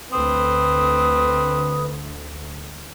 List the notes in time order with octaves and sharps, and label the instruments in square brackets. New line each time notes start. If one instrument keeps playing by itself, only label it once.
[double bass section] D2 [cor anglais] C4 [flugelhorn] B4 [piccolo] D#6